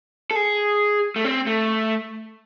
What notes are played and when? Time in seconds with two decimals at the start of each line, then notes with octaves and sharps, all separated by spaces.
0.31 A4
0.36 G#4
1.16 A3
1.24 C4
1.47 A3